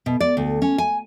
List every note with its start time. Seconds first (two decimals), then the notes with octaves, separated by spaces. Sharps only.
0.06 B2
0.20 D5
0.37 D2
0.62 C#4
0.78 G#5